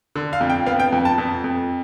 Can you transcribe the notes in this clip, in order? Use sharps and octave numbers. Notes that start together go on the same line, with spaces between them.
D3
F5
F2
G5
B3 F5
G5
F2
A5
F2
F2